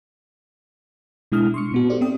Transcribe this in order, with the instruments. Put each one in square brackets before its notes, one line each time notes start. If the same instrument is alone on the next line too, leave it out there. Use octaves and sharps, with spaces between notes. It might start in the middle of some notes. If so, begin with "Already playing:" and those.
[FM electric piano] B2 G#3 D4 E4 D#6 F6
C6 C#6 C#7
A#2 B3 F#4
D#4 G4 A4 C5 D5
C4 E5 G5 D#6